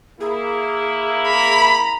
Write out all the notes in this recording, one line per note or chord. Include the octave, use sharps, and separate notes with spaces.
A#3 E4 G#4
A#5 B5